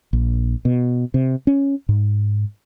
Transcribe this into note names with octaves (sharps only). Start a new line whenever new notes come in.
A#1
B2
C3
C#4
G#2